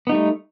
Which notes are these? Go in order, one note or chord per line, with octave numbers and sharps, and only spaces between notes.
G3 A3 B3 D#4